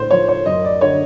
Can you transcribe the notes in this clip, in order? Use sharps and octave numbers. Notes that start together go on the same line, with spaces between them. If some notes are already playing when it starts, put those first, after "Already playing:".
Already playing: A2 D3 C5
F3 C#5
C#5
F#2 D#5
D5
D3 C#5